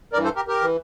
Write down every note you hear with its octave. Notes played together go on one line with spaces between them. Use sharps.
G2 E3 A#4 D5
A4 C5
G4 A#4
G4 A#4
E3